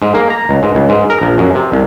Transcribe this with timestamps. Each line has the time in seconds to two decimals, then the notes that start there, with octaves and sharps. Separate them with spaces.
0.02 G#2
0.14 A#3
0.30 A#5
0.49 C#2
0.63 G#2
0.75 C#2
0.89 G#2
1.10 A#4
1.22 A#1
1.38 F#2
1.55 C3
1.72 C2